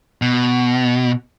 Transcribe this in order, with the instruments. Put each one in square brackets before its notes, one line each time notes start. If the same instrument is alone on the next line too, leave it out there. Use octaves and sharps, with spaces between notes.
[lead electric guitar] B2